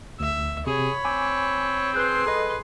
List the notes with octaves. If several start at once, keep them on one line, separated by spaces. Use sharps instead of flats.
D2 E5
C3 G#4 C#5 B5
C4 G#5 D6
G#4 B4 C6 F#6 G6
A4 B4 D#5